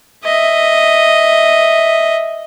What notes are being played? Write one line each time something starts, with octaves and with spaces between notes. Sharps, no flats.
D#5 E5